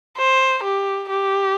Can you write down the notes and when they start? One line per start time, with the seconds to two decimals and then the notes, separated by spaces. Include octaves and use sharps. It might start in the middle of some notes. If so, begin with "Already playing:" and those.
0.17 C5
0.63 G4
1.10 G4